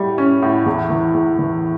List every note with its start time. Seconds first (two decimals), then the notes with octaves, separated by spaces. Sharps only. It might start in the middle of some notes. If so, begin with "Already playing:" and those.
Already playing: A2 G3
0.18 C#4
0.43 A2
0.66 E2
0.90 E3
1.14 E2
1.39 E3